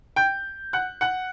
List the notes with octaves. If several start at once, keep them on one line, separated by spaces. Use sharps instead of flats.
G5 G6
F#5 F#6
F#5 F#6